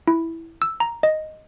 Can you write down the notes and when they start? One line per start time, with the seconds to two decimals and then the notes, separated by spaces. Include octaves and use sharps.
0.08 E4
0.62 E6
0.80 A#5
1.03 D#5